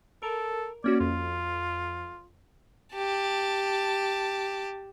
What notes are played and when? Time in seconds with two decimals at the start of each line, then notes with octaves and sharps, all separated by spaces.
0.23 A4 A#4
0.84 A#3 C#4 F#4 D5
1.01 F2 F4
2.95 G4 A5